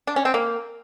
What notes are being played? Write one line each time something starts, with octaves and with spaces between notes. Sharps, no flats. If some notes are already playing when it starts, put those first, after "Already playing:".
D4
C#4
C4
A#3